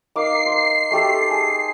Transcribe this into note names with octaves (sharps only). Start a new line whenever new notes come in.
A#3 D#4 D6 C7
C5
A3 G4 A4
G#4